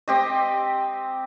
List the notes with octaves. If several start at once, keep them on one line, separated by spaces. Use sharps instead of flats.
C4 G4 D#5